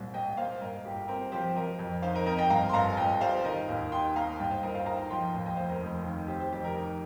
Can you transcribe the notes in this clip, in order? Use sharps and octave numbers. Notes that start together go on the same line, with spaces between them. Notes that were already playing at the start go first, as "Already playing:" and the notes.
Already playing: C2 A#2 C4
C2 D#5 G5
A#3 C5 F5
G2 A#4 D#5
G1 G4
C4 A#4
F3 G4 C5
F3 A#4 D#5
F2
D#4 C5 F5
A#4 D#5
C4 A#4 D#5
D#5 G5
G2 F5 A#5
C6
G1 F5 A#5
G1 D#5 G5
G3 C5 F5
D#3 A#4 D#5
D#2
D#4 G5 C6
A#3 F5 A#5
G2 D#5 G5
C5 F5
G1 A#4 D#5
C5 F5
D#4 F5 A#5
F3 G5 C6
D#2
D#5 G5
F1 C5 F5
A#4 D#5
F1
D#3
C3 G4 C5
G4 C5
F2 G4 C5
A#4
D#4 A#4